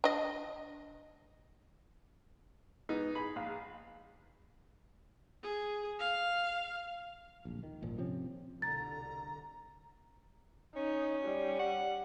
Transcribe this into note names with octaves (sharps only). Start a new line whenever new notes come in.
D4 D#5
G#2 B3 D#4
G#4 B5
A#1 F5
G#4
F5
D1 A#1
D#3
D#1 G#1 A#2 F3
C3 F3 C4 C#4
C2 B2 D3 A#5 A6
C#4 D#4
G3
F#5